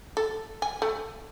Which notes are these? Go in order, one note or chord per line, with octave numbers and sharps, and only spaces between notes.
A4
G#5
A3